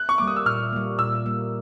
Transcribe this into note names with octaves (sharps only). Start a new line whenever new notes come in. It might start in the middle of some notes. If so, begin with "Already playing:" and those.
Already playing: F#6
C#6
G3 A#3 D6
D#6
E6
A#2 F6
G3 A#3
A#2 E6
G3 A#3